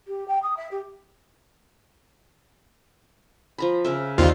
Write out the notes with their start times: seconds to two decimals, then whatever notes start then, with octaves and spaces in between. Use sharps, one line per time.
0.07 G4
0.28 G5
0.42 D#6
0.57 E5
0.71 G4
3.58 F3 A#5 B5
3.85 C#3 A#4 E5
4.18 D#2 G3 C4 D#4 F4